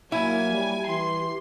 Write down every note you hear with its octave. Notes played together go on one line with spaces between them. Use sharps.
F#3 A#3 E4 G#5
G3
E3 G4 C6